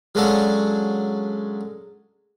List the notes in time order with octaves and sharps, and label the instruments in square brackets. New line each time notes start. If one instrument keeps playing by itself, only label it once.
[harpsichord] F#3 G#3 C#4 D4 A4 F5